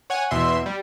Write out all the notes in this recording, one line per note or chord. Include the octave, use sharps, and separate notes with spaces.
C#5 F#5 G#5
E2 B2 E5 C6
G3